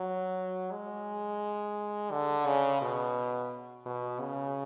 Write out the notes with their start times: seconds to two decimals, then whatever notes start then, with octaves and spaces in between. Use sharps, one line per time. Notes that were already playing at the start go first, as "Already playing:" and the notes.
Already playing: F#3
0.72 G#3
2.11 D3
2.46 C#3
2.81 B2
3.86 B2
4.20 C#3